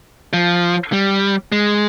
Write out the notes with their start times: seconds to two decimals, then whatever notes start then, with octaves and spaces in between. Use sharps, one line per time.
0.33 F3
0.93 G3
1.52 G#3